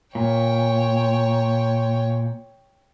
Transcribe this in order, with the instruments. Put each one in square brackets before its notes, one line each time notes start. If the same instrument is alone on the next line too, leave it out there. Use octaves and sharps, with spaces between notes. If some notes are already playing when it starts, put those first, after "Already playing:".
[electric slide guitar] A#2 [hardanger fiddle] C#5 G5